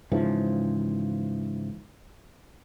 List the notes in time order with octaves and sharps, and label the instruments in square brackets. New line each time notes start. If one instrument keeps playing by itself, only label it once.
[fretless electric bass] G#2 C#3 E3 F3